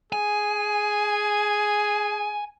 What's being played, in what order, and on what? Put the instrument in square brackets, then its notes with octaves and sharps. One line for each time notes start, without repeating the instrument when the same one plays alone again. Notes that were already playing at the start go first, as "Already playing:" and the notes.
[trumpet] G#4 [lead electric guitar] G#5